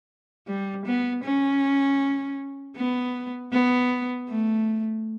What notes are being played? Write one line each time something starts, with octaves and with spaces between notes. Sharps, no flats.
G3
B3
C#4
B3
B3
A3